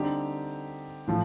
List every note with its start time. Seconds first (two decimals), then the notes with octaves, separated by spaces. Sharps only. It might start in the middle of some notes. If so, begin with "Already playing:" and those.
Already playing: D3 G3 C4 D#4 G4
1.08 A2 F3